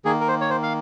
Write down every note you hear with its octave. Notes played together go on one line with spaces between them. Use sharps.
D#3 A#3 G#4
A#4
C5
C#5
C5
F5